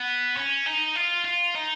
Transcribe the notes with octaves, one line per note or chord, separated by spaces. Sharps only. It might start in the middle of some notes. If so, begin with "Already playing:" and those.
Already playing: B3
C#4
D#4
F4
F4
D#4